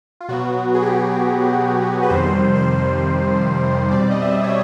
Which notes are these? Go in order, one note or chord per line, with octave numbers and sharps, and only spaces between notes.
F4
B2 F#3 B3 F#4
G#4
G4
G#4
B4
F2 C3 D#3 G3 C5
C5
B2 G3 C4 D5
D#5
E5
C#5